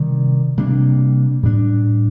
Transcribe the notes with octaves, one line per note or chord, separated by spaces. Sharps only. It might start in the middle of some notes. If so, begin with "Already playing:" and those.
Already playing: C3 D#3 G3
C3 G3 A#3 D4
A2 G3 D4